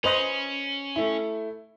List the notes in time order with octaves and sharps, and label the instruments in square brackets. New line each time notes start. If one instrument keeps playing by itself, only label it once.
[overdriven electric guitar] C#4 [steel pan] B4 C5 D#5 [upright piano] F7
[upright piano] A3 E4